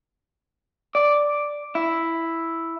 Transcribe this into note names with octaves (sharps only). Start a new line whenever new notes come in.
D5
E4